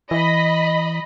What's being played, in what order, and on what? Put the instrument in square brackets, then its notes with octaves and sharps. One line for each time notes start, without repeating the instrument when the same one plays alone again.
[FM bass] E3 [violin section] D#5 B5